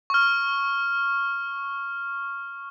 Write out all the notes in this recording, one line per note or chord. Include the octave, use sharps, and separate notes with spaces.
C#6 F6